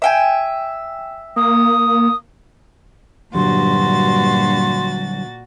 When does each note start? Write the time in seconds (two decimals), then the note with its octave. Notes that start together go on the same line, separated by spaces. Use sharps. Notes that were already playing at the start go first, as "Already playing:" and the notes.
0.02 E5 G5 G#5
1.36 A#3 D#6
3.34 G2 A#2 D3 F#3 G3 F#4 C6 A6